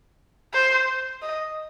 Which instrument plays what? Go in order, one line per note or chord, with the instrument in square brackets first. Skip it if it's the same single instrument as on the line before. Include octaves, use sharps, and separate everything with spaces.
[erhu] C5
D#5